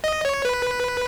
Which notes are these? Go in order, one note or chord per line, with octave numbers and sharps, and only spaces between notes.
D#5
C#5
B4